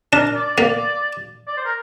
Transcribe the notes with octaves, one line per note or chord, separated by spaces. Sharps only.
D4 A#4
D5
A#3
D5
C5
A#4